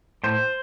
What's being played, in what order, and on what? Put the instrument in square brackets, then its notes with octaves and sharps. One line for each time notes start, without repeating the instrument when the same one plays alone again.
[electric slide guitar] A2 C5